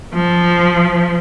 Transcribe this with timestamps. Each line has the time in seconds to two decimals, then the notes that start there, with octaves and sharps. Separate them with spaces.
0.14 F3